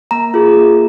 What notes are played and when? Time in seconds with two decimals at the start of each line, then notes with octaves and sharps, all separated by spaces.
0.11 A#3 A#5
0.34 F4 G#4
0.57 A#3